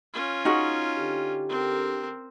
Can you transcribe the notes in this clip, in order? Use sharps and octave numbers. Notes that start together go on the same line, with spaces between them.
C#4 F4
D#4 F#4 G#4
D3 G4
C4 A#4